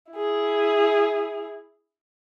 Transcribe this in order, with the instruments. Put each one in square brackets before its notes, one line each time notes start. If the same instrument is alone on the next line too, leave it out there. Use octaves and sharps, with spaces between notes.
[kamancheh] E4 G#4